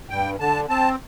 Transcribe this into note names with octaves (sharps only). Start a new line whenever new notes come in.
G2 G5
D3 A5
C4 A5